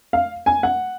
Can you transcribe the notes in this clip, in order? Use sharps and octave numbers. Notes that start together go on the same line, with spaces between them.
F5
G#5
F#5